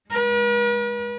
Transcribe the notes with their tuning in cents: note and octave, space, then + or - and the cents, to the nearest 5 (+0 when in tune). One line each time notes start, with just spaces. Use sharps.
G#3 +0 B4 -45